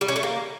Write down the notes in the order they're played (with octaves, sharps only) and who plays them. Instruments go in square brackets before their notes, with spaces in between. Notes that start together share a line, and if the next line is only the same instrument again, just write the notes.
[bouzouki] G3
C#4
A3
A#3